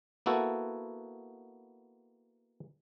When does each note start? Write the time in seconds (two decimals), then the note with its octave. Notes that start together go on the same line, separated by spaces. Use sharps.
0.26 A#3 B3 E4 F#4 A4